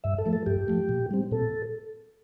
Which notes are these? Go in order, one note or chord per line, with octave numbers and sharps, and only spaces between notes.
G2 E5
A4
F3 A3
A4
G2 G4
F3 A3
A#2
G3 C4
A#2 A4